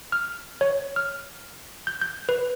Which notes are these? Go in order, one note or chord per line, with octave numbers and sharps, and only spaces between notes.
F6
C#5
F6
G6
G6
B4